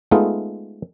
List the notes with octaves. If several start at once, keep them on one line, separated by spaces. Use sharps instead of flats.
G#3 A3 B3 D#4 F4